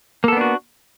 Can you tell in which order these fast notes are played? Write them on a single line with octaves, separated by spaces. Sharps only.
A#3 A4 B3 D4 F#4